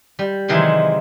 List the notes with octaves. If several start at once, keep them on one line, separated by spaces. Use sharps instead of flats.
G3
C3 D#3 E3 F#3 G#3 E4